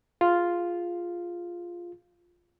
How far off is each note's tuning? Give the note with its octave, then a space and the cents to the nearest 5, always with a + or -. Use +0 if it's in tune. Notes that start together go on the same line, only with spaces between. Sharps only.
F4 +0 G#4 +0